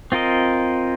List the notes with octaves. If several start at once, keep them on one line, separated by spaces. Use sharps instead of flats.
C4 F4 A#4 D#5